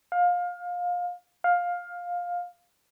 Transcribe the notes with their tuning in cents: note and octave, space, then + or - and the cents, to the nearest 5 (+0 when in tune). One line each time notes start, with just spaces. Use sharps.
F5 +25
F5 +15